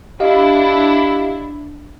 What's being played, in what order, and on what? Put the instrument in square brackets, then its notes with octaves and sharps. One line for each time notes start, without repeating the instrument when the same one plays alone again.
[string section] D4 E4 [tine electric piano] G4 D#5 F5